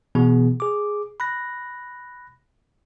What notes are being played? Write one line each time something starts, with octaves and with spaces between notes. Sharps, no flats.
B2 E3 B3 G#4
G#4 D6
B5 F#6 A#6